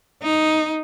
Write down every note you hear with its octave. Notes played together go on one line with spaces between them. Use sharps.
D#4